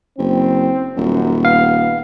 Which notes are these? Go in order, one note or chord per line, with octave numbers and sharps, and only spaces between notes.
F#1 C4
D#1 F#2
B3 F5